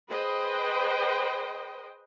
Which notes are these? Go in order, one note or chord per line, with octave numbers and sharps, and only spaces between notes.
G#4 B4 C5 D#5 G5